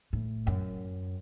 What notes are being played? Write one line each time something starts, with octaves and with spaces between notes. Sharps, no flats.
A2
F#2